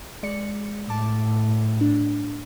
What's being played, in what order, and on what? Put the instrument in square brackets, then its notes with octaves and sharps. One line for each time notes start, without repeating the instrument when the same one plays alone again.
[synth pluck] G#3 D5 C#7
[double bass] A2 [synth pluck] A5 D6
[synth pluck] D4